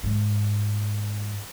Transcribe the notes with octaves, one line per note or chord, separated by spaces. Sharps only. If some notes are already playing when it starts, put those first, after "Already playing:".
G#2